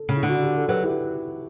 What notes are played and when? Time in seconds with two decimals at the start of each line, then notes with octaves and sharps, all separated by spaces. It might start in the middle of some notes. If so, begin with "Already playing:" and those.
Already playing: A4
0.09 C#3
0.16 E4
0.23 D3
0.29 F#4
0.42 G4
0.56 A4
0.68 F#3 G4 B4
0.83 E4 G4